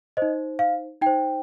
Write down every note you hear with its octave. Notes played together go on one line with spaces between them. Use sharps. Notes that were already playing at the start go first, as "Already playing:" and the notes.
D#4 C5 D#5
F5
D#4 C5 G5